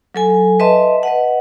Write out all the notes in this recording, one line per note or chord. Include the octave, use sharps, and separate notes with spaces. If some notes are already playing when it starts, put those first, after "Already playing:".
F#3 A4 G#5
B4 D#5 E5 A5 C6
B4 D#5 F#5